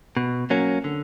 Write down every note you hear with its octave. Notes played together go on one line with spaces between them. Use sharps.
B2
F#3 A#3 C#4
D3